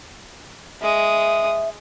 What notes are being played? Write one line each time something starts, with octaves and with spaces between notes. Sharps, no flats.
G#3 E5 D#6